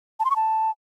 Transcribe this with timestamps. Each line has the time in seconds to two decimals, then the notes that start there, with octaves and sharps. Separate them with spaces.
0.20 A5
0.25 C6
0.30 C#6
0.36 A5